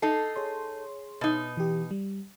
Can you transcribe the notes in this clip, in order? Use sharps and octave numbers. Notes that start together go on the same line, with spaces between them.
D#4 A4 C7
G#4 C#5 C6
B2 D#4
E3 G4
G3